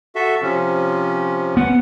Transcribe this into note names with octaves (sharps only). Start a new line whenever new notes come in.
F#4 A4 E5
C3 F3 C#4
B3 F#5